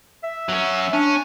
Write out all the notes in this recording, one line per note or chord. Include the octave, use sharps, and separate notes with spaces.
E5
F#3 C#4
C#4 D4